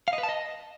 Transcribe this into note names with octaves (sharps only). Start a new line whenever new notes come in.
F5
D#5
B4
A5
D#5